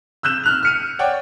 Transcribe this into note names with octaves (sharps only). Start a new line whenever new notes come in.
E6 F#6 G6 E7
F6 F#6 F7
F6 C#7 D#7
C#5 D5 F#5 G5